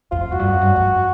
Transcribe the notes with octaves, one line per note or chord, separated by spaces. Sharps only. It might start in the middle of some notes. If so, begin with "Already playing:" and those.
F2 F4
F2 F#4
G2
F#2
G2
F2